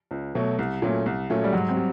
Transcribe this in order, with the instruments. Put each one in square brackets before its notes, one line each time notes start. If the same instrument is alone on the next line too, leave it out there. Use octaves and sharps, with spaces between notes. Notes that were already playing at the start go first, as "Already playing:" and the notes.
[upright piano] C#2
B2 F#3 A3
C2
A#2 F#3 A3 C#4
C2
A#2 F#3 A3 C#4
[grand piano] G3
[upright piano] G#2 [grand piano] F#3
[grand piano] C4
[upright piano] G3